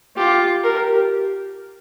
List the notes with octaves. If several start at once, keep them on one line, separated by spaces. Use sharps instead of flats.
F4 G4
G4 A#4